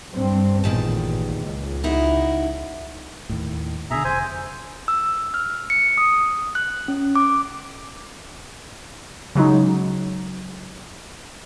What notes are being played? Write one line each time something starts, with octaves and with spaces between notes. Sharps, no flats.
G2 C4
A1 E2 A#2 D#3 A5
C#2
D#4 E4 F#4
D#2 A2
B2 D3 G#4 E5 A#5
F1 C5 G#5
E6
F6
C#7
D#6
F#6
C#4
D6
C#3 F#3 G#3 D#4